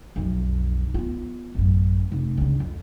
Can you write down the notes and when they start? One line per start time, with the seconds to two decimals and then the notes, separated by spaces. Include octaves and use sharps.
0.16 B1 F2
0.94 B3 F4
1.55 A1 F#2
2.12 F1
2.37 C#2 D3
2.60 F2